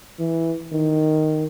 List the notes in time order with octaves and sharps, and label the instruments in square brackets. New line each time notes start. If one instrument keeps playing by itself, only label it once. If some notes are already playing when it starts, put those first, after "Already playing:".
[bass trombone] E3
D#3